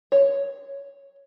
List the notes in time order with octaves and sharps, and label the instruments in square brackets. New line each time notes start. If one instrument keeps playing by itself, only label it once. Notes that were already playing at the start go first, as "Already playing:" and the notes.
[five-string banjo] C#5